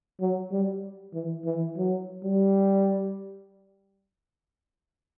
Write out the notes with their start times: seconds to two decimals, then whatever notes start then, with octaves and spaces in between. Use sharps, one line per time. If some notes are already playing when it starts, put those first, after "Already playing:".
0.20 F#3
0.52 G3
1.14 E3
1.45 E3
1.77 F#3
2.24 G3